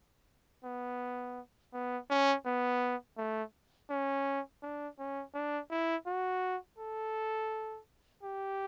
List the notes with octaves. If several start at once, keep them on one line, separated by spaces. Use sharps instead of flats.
B3
B3
C#4
B3
A3
C#4
D4
C#4
D4
E4
F#4
A4
G4